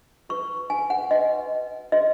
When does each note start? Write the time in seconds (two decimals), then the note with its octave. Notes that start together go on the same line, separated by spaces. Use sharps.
0.29 F#4 B4 C#6
0.70 G#5
0.90 F#5
1.11 F#4 B4 D#5
1.92 F#4 B4 D#5